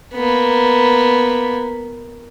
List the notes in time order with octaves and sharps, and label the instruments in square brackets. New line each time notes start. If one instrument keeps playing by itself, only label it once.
[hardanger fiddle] A#3 B3